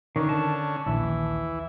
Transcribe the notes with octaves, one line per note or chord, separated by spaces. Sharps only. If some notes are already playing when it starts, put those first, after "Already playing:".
D3 D#3 C#4
A5
A#1 D#2 E3